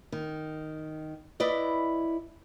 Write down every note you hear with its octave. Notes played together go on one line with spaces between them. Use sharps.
D#3
E4 B4 D5 D#5